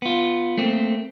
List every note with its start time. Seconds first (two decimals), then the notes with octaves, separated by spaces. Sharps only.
0.02 B3 F4
0.57 A3 A#3 C4